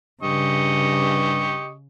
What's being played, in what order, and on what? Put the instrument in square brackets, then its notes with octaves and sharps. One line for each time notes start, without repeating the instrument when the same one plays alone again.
[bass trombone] G2 [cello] C#3 [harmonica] G4 D#5 C#6